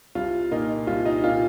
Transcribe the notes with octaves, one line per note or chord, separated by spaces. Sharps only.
C2 F4
A#2 A#3 D#4
C2 F4
D#4
A#2 A#3 F4